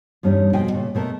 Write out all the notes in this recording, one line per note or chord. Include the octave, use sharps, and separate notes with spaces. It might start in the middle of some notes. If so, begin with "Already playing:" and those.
E2 G2 G3 C#4 D#4
F2 B2 D#5 G5 G#5
A#2 C#3
B2 A3 A#4